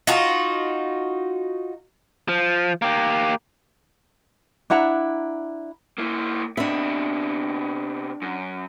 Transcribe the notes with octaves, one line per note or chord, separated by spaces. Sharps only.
D#4 F4 F#4
F3
A#3 G4
D4 E4 F#5 A#5
A#3 E4
C3 B3 D4 E5
F#2